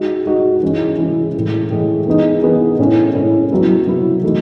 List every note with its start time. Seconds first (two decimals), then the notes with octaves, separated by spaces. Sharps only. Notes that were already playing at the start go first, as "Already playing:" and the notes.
Already playing: G#3 D#4 F#4
0.26 G#3 D#4 F#4
0.62 E3 G#3 C#4 E4
0.98 E3 G#3 C#4 E4
1.34 A2 E3 G#3
1.71 A2 E3 G#3
2.06 E3 B3 D#4 G#4
2.43 E3 B3 D#4 G#4
2.79 A2 G#3 C#4 E4
3.15 A2 G#3 C#4 E4
3.51 F#3 B3 E4
3.87 F#3 B3 E4
4.23 E3 A3 D#4 F#4